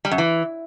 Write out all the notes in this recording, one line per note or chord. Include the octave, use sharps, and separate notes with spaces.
G3
F#2
E3